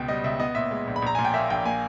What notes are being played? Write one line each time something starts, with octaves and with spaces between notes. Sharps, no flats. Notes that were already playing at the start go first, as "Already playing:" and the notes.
Already playing: C#2 B2 G5
G3 D#5
C#2 E5
B3 D#5
A#2 E5
G#3
A#1
B5
A#1 A#5
A#2 G#5
G5
A#3 E5
A#1 G5
A#3 G#5